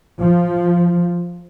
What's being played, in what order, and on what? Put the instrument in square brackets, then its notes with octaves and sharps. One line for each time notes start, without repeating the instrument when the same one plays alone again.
[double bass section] F3